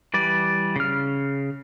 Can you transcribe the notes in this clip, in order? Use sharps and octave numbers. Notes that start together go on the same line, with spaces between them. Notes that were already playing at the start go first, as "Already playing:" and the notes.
E3 G3 D5
C#3 F6